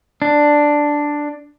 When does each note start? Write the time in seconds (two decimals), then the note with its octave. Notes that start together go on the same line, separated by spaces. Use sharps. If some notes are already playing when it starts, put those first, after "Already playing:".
0.22 D4